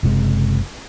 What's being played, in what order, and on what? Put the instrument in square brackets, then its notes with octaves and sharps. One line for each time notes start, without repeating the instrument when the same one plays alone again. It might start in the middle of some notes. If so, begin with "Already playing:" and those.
[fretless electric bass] F#1 C3 G#3